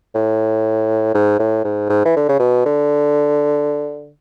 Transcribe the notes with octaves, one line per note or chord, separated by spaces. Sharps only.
A2
G#2
A2
G#2
G#2
E3
D3
C#3
B2
D3